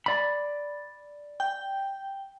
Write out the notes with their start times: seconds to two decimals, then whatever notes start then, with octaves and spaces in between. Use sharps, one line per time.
0.06 D5 B5
1.40 G5